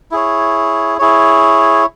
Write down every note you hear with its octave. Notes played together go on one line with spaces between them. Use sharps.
E4 G#4 C#5
E4 G#4 C#5